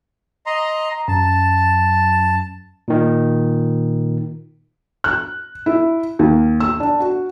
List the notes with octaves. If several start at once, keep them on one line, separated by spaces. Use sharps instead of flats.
D#5 A#5 C6
A#5
F#2 A5
A#2 D#3
F#6
E4
D#2
E6
D4
F#4